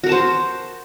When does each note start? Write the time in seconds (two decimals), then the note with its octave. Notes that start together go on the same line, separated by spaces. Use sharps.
0.04 F#4
0.06 A#4
0.09 A5
0.12 C5